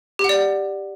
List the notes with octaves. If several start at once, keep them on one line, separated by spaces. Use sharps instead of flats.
G4
F#5
D5